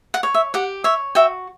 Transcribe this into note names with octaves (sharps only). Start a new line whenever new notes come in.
F#5
C#5
E5
G4 F#5
C#5 E5
F#4 E5 G5